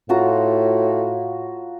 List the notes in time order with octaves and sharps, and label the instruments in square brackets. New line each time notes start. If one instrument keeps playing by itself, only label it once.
[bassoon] A2 [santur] F4 F#4 A#5